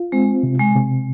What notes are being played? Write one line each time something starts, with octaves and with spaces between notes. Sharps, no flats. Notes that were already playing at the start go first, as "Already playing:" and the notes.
Already playing: F4
G#3 C4
C3
G#3
C3